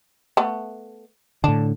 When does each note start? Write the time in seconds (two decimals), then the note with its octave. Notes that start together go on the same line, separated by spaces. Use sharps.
0.37 A3 B3
1.44 A2 D3 D4